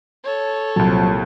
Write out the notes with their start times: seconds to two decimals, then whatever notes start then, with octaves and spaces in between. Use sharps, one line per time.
0.24 A4 C#5
0.76 C2 A#2 F3 F#3 C4 A5